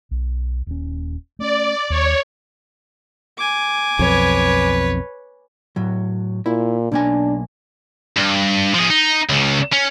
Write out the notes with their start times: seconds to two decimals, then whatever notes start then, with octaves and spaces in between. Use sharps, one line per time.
0.11 B1
0.67 D#1 C#4
1.39 A3 C#4 D5
1.90 D#2 C#5
3.38 G#5 D6
3.99 B1 F2 B4 C#5
5.76 A2 F#3
6.46 A#2 E4
6.92 B1 A#3 D4 G#5
8.17 G2
8.75 F3 G#4
8.91 D#4
9.29 C#2 C#3
9.73 C#4